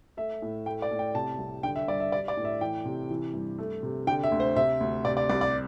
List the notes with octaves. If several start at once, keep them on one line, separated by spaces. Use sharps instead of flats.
A3 E5
A2
A3 G5
D5
A2
G5
C3 A5
C2
D3 G5
E5
G2 D5
E5
G3 D5
D5
A2
E5
E3 G5
C3
E3
G2
A3
C3
D3 G5
E5
D2
C5
C3 E5
D2
C3 D5
D5
C2 D5
D5